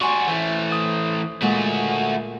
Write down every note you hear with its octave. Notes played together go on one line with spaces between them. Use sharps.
G3 F#4 G#5 C6 C#6
E3 A3 C5
D#6
A#2 G#3 A3 F#4